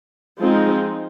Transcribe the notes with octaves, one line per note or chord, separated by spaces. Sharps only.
F3 G#3 C4 D#4